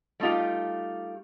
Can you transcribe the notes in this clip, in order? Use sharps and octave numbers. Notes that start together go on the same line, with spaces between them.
G3 A3 D#4 F4 G4